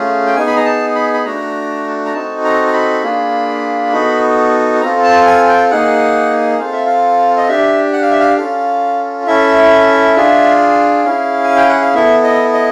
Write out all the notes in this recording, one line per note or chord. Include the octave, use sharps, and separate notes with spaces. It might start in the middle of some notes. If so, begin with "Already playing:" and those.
Already playing: A3 C#4 F4 G#4
G5
B3 D#4 G#4 G#5
B5
A#5
A5
B5
B5
A3 D4 F#4 A4 A#5
A#5
C4 D#4 F#4 A4 A5
A#5
A#5
B5
A#3 D4 F4 G#4
B3 D#4 F#4 A4
C4 F4 A4 A#5
A5
G#5
G5
A#3 D#4 G#4 F#5
C4 F4 A4 F5
E5
F5
D#5
D4 G4 E5
F#5
F5
E5
F5
C#4 F4 A4 F5
C#4 E4 A4 E5
D4 F4 G#4
C#4 E4 G#4 F5
G#5
G5
F#5
F5
B3 E4 A4 E5
D#5
D#5